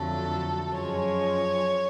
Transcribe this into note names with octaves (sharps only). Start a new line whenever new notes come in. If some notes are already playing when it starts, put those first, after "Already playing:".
Already playing: F2 D3 F#3 A3 A4
F#2 F3 G#3 C#5